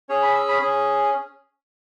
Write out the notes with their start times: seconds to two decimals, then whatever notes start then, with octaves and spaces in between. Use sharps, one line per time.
0.09 C#4 G#4 C#5
0.22 B5
0.35 E6
0.48 B5
0.61 C#4 G#4